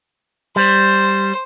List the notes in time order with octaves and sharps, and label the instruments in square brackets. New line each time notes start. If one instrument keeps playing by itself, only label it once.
[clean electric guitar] G3 [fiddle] C5